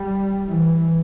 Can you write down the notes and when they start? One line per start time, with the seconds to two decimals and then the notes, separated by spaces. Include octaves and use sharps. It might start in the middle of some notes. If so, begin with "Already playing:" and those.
Already playing: G3
0.47 E3